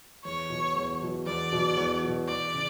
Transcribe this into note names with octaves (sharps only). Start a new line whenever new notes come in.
E2 C#5
B2 F#3
E2
B2 F#3
E2 D5
B2 F#3
E2
B2 F#3
E2 D5
C#3